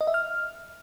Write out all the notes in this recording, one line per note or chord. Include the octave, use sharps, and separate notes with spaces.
D#5
E5
F6